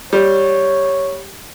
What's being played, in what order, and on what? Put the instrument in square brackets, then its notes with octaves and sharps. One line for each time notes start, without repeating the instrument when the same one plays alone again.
[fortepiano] G3 [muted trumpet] C#5